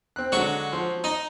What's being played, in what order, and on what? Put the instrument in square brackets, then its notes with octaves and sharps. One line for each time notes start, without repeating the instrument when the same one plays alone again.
[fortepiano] C4 F#6
[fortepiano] D3 G#3 [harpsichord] F#3 C#6
[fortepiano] F3 C6
[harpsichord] D#4